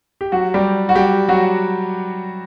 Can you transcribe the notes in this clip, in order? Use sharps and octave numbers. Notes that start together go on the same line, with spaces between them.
G4
F#3 F#4
G3 G4
F#4
G3 G4
F#3 F#4